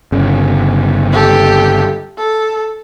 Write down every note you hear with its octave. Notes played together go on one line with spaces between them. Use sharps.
G1 C#3
G4 A4
A4